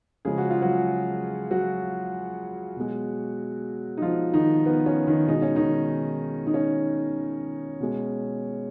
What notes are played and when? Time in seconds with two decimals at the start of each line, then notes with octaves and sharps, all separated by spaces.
0.25 C#3 F3 G#3 G#4
0.38 F#4
0.50 F4
0.62 F#3 F#4
1.51 F#3 F#4
2.76 B2 G#3
3.97 D#4
4.02 F3 F4
4.34 D#3 D#4
4.66 B3
4.86 C#4
5.07 D#3 D#4
5.28 B2 G#3 D#4
5.42 C#4
5.56 D#3 D#4
6.47 D#4
6.54 C#4
7.80 B2 G#3